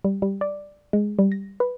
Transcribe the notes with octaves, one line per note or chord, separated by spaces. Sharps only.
G3
G3
D5
G#3
G3
A#6
B4